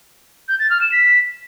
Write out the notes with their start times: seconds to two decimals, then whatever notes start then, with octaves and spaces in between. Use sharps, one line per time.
0.48 G6
0.59 A6
0.70 F6
0.81 E7
0.92 B6